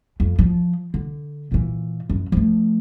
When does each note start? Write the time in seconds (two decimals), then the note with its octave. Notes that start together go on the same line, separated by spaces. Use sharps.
0.20 F2
0.39 F3
0.94 D3
1.51 A#2 E3
2.10 F#2
2.32 F3 A3